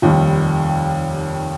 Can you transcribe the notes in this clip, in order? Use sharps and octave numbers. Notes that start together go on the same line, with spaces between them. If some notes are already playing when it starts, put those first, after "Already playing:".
F1 D#2 D#3 G3